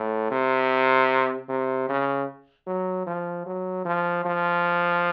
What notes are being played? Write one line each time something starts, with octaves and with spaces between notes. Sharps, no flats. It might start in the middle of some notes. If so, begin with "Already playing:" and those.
Already playing: A2
C3
C3
C#3
F#3
F3
F#3
F3
F3